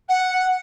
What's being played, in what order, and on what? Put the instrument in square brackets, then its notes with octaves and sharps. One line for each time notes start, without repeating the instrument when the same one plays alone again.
[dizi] F#5